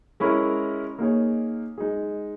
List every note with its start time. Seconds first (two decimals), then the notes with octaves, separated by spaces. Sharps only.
0.20 G#3 C#4 E4 A#4
0.99 A#3 D#4 G#4 C#5
1.78 G#3 D#4 G#4